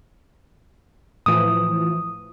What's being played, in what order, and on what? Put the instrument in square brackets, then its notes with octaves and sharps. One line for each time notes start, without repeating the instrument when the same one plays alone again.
[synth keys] A2 E3 F3 [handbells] D#6